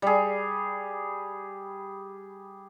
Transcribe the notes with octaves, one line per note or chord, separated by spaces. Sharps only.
G3 G#4